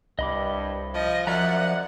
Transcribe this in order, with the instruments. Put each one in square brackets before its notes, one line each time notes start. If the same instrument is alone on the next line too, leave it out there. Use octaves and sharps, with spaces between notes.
[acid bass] C2 [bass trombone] G2 [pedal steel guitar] D#5 B5 D6
[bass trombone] F3 [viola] D#5
[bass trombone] F#2 [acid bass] F3 [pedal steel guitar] D5 E5 A#5 [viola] F#5